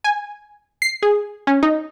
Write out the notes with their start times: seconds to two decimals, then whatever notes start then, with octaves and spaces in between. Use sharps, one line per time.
0.04 G#5
0.82 C7
1.02 G#4
1.47 C#4
1.63 D#4